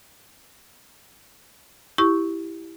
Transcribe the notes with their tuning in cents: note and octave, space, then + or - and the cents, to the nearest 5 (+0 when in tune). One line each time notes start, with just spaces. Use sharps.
E4 +0 G4 +0 C#6 +0